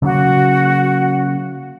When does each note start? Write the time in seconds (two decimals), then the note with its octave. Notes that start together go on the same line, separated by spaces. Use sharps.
0.02 C#3 F#3 A#3 F#4